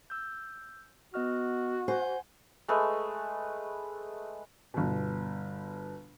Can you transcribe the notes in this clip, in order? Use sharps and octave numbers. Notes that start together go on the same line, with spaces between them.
E6 G6
B3 F#4 D#5 F6
C5 F#5 G#5
G#3 A3 B4 C#6
G1 B2